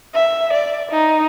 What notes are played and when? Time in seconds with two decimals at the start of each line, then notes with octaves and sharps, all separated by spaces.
0.15 E5
0.53 D5
0.91 D#4